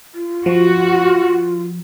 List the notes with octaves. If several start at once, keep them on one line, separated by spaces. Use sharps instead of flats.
F4
F3 F#4